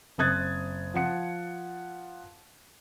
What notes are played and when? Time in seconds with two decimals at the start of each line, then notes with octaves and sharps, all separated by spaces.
0.18 F#1 C4 D#6 F#6 G#6 A6
0.94 F3 F#5 C#7